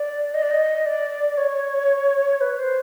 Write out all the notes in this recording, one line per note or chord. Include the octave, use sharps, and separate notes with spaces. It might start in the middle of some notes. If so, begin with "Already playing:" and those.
Already playing: D5
D#5
D5
D#5
D5
C#5
B4
C5